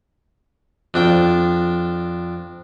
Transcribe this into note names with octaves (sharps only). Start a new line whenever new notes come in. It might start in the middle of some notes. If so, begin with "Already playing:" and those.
F2 D4 G5